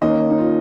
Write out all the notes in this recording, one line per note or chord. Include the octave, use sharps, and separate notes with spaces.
D#2 D#3 A#3 C#4 D#5
D#4
F4